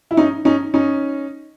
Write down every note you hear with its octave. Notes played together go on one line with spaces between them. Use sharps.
E4
C#4 D#4
C#4 D#4
C#4 D#4